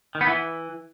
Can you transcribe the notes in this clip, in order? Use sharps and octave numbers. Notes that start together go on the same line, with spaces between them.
D#3
B3
E3